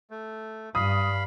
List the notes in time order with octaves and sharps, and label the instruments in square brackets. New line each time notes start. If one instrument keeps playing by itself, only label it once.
[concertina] A3
[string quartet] G2 [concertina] F5 B5 [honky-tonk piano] D#6